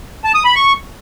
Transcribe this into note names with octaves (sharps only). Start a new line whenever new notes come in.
A5
D#6
B5
C#6